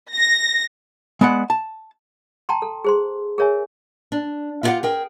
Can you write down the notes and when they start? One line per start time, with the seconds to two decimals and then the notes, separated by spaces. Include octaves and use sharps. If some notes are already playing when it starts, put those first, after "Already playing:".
0.14 A#6
1.21 G#3 B3 D5 F#5
1.50 A5
2.49 G5 A5 A#5 C6
2.62 A4
2.84 G#4 C5 C6
3.38 G#4 A#4 C#5 E5 G#5
4.12 D4
4.63 E4 F4 G4 D#5 F5 F#5
4.83 G#4 A#4 G5